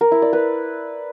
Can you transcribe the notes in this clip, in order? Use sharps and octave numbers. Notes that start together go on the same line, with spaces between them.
A#4
E4
D5
B4